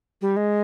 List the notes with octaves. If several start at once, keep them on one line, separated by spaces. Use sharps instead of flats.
G3
G#3